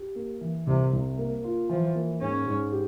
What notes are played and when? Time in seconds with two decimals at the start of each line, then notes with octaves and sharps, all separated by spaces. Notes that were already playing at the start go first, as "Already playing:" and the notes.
Already playing: G4
0.16 A#3
0.41 E3
0.67 C2 C3
0.93 C2
1.18 A#3
1.44 F4
1.69 E3 F3
1.95 A#3
2.21 G#2 C#4
2.47 G#2
2.72 G4